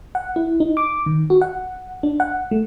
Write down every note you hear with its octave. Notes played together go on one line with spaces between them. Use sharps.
F#5
E4
D#4
D6
D#3
F#4
F#5
D4
F#5
A3